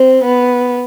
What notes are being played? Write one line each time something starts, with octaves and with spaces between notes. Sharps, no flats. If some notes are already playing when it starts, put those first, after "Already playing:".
Already playing: C4
B3